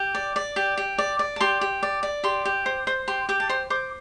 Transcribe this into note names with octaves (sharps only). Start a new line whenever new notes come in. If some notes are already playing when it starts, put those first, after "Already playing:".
Already playing: G4
D5
D5
G4
G4
D5
D5
A5
G4 C6
G4
D5
D5
G4 C6
G4
C5
C5
G4 C6
G4 D6
A5
C5 C6
C5 D6